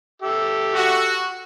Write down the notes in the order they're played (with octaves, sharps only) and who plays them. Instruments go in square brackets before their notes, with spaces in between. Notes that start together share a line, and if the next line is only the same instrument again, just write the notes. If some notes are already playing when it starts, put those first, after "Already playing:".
[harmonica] G4 A4 E5
[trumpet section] F#4